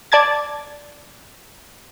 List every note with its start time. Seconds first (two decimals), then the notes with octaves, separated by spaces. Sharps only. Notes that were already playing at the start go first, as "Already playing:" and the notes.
0.12 D5 A5 G#6 A6